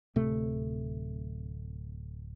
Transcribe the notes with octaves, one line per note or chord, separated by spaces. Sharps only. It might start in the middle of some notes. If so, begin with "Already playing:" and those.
D1 C3 A3